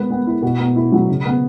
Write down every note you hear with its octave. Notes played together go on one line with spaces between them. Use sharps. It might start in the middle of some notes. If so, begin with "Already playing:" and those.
Already playing: G#3 B3 B4
B3
E4
B2
B3
E4
F#3
C#3
B3